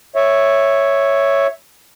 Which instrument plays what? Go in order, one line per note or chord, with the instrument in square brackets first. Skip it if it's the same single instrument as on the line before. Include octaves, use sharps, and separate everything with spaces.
[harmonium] C#5 E5